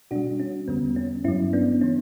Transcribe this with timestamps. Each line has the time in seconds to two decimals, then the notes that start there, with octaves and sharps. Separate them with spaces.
0.11 B2 D4 F#4
0.15 G3
0.40 C#4
0.68 E2 D3 G3 B3
0.96 C#4
1.24 G2 F#3 C#4 E4
1.53 B3 D4
1.81 E3 C#4